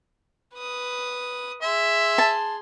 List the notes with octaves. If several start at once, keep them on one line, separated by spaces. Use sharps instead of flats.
B4 D#6
G#4 E5 C6
A5